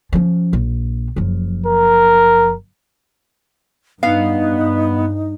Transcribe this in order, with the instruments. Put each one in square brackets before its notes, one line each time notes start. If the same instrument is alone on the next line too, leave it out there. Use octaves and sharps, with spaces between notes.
[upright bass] F3 C#4
A#1
F#1 F3
[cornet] A#4
[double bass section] G2 [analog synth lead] B3 [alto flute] D#4 [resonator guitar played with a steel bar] F5